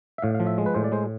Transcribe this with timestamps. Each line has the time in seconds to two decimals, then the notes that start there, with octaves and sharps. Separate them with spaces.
0.18 E5
0.22 A2 F5
0.34 F5
0.40 F3
0.47 E5
0.58 G#3
0.66 B4
0.74 A2 C5
0.84 D5
0.92 G#3 C5